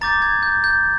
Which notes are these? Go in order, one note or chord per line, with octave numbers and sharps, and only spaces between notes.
A#5 D6 G6 A6
G#6
G6
G6